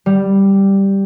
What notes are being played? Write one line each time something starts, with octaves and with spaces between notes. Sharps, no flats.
G3